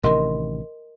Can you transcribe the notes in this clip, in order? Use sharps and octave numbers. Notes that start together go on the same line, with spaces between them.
A1 C3 D#3 A#4 D#5 C6